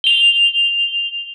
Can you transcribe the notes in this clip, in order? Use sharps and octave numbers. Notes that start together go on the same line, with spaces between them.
F7 G7